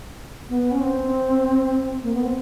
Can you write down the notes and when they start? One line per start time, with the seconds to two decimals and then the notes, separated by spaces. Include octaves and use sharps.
0.49 B3
0.71 C#4
0.80 C4
2.03 A#3
2.14 B3
2.23 C4